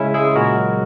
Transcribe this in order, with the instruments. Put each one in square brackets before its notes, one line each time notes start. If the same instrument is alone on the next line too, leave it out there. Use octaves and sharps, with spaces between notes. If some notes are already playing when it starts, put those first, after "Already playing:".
Already playing: [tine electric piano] C#3 G#3 C#4 E4
G#3 E4 G#4
A#2 F#4 A#4
F#3